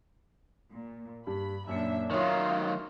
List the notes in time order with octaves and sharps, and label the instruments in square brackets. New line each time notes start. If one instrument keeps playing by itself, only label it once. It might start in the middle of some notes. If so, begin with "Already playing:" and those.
[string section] A#2
[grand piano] G2 [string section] B5
[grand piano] F#2 A#2 C#7 [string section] D4 E5
[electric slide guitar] D#3 F#3 [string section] D#4 F4 [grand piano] C#5 E5 D#6